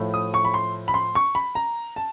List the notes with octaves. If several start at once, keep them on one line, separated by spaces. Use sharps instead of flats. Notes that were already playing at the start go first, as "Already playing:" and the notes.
Already playing: A2 F3 A3
D#6
C#6
B5
C6
B5
C6
C#6
B5
A#5
A5